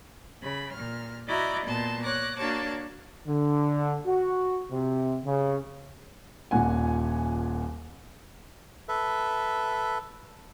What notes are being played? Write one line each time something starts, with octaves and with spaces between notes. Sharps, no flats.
C#3 B5
A#2 F6
E4 F#4 D5 D#5 A#5 D6
A#2 B3 A5 C6
C#5 D6 F#6 A#6
A#3 D4 F#4 C#5 A5 D6
D3
F#4
C3
C#3
D#1 A#2 F#5 G#5
A4 B4 E5